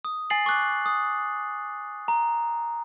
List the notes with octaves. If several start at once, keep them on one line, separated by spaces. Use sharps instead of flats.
D#6
G#5 A6 C7 F#7
C#6 D6 F#6
D#6
A#5